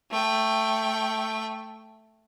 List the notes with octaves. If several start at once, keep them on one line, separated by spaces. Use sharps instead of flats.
A3 G5